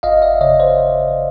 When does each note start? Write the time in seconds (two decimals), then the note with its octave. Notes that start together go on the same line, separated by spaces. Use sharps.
0.03 G1 D#5 F5
0.22 D5 E5
0.41 F2 C#3 C#5 D#5
0.60 C5 D5